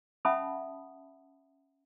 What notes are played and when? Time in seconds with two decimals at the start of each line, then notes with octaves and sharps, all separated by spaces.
0.25 C#4 E5 F#5 A5 B5 D#6